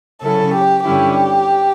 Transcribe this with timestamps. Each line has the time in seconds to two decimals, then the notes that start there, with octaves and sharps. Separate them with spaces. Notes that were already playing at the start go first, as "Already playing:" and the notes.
0.23 C#3 F#3 C#4 E4 A4
0.54 G4
0.85 G2 D3 G3 C#4 E4 G4